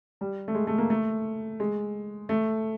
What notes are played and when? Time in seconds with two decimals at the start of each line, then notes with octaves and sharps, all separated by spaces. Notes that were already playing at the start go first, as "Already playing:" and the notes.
0.21 G3
0.48 A3
0.55 G#3
0.67 A3
0.78 A#3
0.90 A3
1.60 G#3
2.29 A3